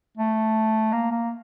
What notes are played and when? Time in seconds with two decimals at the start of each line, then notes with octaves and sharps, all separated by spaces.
0.17 A3
0.92 A#3
1.11 A#3